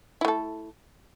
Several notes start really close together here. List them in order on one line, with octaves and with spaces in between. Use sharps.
E4 A3 A4